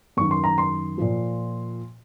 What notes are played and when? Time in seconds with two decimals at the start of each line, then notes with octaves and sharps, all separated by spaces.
0.17 F#2 D#3 C#6
0.31 C6
0.44 A#5
0.58 C6
0.98 A#2 F3